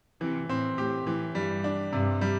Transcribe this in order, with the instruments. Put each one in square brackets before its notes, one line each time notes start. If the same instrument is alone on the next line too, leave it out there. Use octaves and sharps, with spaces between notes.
[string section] C3 [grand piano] E3
[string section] A2 [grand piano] C4
[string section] A2 [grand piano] G4
[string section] A2 [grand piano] E3
[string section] G2 [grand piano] G3
[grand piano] D4
[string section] G2 [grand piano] C3
[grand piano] G3